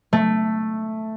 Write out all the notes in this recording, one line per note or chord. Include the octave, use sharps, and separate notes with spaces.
A3